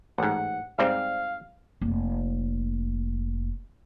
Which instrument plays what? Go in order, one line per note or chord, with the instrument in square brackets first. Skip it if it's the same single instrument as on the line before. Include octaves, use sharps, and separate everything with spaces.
[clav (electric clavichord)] A1 G#2 [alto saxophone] F#5
[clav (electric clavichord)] G#2 G3 C4 [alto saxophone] F5
[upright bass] F1 A#3